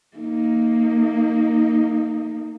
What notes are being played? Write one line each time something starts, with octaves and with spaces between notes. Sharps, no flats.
A#3 D#4